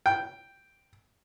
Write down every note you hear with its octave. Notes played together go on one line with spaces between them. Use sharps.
G5